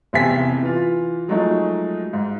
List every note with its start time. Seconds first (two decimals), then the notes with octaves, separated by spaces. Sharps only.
0.13 F1 E2 C3 E5 G#5 B6
0.63 E3 F4
1.28 F3 F#3 G#3 A3 D#4
2.13 G#2